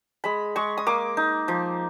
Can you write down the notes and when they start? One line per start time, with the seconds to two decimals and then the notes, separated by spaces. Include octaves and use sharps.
0.24 G#3 B5
0.56 G#3 C#6
0.77 D#6
0.87 A#3 D6
1.17 D#4
1.48 F3